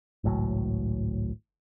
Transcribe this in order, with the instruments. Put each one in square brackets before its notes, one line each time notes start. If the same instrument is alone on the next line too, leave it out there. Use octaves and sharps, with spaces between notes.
[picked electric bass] G#1 C#2 A2 F#3